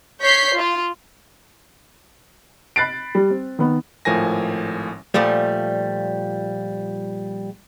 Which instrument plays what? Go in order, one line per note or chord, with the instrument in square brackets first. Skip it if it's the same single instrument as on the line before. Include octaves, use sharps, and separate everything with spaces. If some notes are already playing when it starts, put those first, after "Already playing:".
[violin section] C#5 G6 B6 C7
F4
[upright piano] B5 F#6 A6 C7 D7
G3
C4
D#3 B3
[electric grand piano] G#1 A2 F3 A#4 G#5 A#6
[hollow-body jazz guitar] A#2 F3 G3 A3